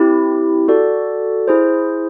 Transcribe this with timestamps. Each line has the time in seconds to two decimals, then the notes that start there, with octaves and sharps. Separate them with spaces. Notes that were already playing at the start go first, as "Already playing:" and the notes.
Already playing: C4 E4 G4
0.68 F#4 A4 D5
1.48 E4 G#4 C5